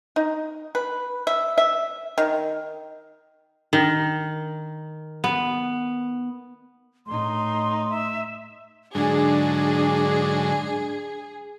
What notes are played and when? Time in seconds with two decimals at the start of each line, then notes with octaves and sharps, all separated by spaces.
0.16 D#4
0.75 B4
1.27 E5
1.58 E5
2.18 D#3
3.73 D#3
5.24 B3
7.07 A2 D#4 C6
7.90 E5
8.95 G#2 D3 F#3 D4 G#4